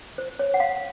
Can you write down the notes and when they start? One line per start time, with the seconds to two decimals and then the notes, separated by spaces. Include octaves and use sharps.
0.18 C5
0.39 C#5
0.54 F#5
0.60 F5